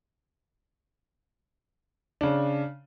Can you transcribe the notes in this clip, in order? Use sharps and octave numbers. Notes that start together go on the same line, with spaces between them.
C#3 D4